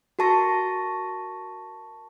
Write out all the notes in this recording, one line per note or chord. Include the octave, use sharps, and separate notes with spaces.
F#4 A#4 A5 C#6 A#6